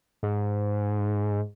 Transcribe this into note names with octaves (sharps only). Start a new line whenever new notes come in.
G#2